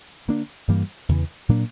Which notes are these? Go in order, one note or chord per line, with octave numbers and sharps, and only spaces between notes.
D3 A#3 D4
G2 E3 G3 A#3
E2 C#3 E3
A#2 F#3 A#3 D4